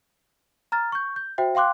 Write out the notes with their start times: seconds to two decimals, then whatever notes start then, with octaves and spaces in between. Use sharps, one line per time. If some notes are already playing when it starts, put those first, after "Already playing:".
0.72 A#5 F6 A6
0.92 C#6 G6
1.16 G6
1.38 F#4 C5 E5 G5
1.55 F5 G5 C6 D6 F#6